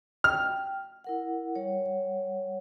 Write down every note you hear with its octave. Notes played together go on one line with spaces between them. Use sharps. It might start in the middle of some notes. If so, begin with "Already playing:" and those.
G5 F6
E4 A#4 F#5
G3 C#5 F#5